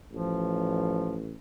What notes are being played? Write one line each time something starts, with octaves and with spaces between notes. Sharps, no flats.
A1 F3